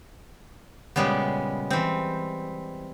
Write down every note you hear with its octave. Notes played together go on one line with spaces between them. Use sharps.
A#2 C#3 G3 G#3 B3
E3 C4